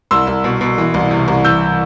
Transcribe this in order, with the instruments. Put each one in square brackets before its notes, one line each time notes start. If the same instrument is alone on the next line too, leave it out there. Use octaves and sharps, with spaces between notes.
[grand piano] C2 C6 E6
C2
B2
B2
E3
C2
C3
C2
E3 E6 G6